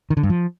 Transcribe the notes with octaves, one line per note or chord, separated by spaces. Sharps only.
D#3
D3
G2
F3